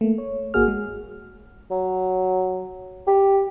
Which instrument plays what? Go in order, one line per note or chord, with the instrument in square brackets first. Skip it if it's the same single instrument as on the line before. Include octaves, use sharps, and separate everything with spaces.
[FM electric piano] A3 A#3
C#5
G#1 A#3 F#4 G#4 F6
G#3
[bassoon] F#3
G4